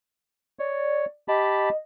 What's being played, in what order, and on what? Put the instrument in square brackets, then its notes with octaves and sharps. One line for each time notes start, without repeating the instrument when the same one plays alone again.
[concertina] C#5 [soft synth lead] D5
[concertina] G4 A5 B5 [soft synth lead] D#5